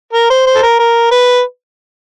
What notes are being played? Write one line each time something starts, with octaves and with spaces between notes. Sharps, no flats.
A#4
C5
C5
A4
A#4
A#4
B4